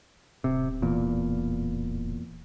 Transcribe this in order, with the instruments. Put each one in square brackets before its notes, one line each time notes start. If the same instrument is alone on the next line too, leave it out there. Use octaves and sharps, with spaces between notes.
[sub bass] D1 [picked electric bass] C3
[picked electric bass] E2 A#2